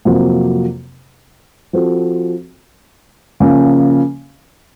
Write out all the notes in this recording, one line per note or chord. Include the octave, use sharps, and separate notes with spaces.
F2 C3 F#3 A#3
F3 C4 F#4 A4
C#3 F3 A#3 C#4